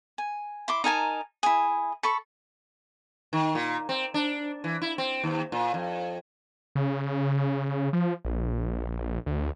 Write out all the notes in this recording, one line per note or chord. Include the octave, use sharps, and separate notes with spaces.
G#5
E4 C6 D6
D#4 A#4 G#5 A5
E4 G#4
A4 B5 C#6
D#3
A#2
C4
D4
E3
E4
C4
D#2
A#2
F2
C#3
F3
A#1
D2